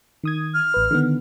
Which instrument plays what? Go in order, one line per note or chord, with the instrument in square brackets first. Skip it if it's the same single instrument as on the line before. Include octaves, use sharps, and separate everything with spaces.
[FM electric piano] D#3 D#6 G#6
[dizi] F6
[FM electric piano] A1 B4
D3 D#3 B3